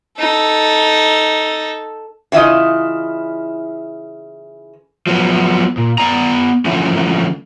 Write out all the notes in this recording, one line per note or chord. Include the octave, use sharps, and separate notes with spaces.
D#4 A4
C#3 E3 E4 F4 D#5
F3 F#3 B3
A#2
B3 D5 A#5
D3 E3 F3 A3 C#4